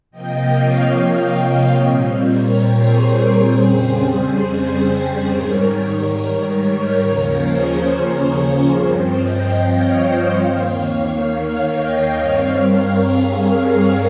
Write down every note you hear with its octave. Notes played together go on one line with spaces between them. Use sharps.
C3 F3 A#3 D#5 G5
C#5 F5
A#2 G3 C4
A#4 C#5
G#4 C5
A#4
F2 C#3 G3 C4 G#4 C5
G#4 C5
G#2 D#3 G3 A#4 C#5
A#4 C#5
A#4 C#5
A#4 C#5
D#2 C#3 F3 A#3 A#4 C#5
G#4 C5
A#4 C#5
G2 F3 C4
D#5 G5
C#5 F5
C5 D#5
D#2 D#3 A#3 C#5 F5
C#5 F5
D#5 G5
G2 G3 C4 C#5 F5
A#4 C#5
G#4